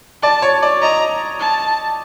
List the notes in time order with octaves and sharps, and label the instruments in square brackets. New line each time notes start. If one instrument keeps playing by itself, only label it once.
[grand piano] D5 [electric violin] A5
[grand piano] C#5
D5
[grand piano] D#5 [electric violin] A#5
[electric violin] A5